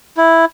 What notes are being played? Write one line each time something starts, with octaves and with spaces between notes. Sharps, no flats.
E4